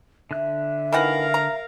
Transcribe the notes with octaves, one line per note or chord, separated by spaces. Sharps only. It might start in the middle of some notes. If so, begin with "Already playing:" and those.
D3 E5 F#6
D#3 E3 A#4 F5 F#5
A#5